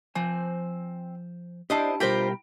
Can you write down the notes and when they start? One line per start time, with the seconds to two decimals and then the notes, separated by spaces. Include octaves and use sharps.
0.15 F3 C4 C5 G#5
1.70 D4 E4 G4 C5 D#5 A5
2.00 B2 G3 F4 G4 A#4 C5 G5 B5